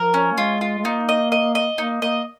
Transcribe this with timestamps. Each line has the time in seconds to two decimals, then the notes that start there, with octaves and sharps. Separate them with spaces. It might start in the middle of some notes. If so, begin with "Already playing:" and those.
Already playing: F3 A#4
0.14 C#4
0.32 A#3
0.37 G#3 F4
0.61 F4
0.78 G#3
0.85 A#3 D#4
1.09 D#5
1.32 D#5
1.55 D#5
1.78 A#3 D#4
2.02 A#3 D#5